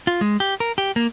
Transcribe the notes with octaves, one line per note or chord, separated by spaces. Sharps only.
F4
G#3
G4
A#4
G4
A#3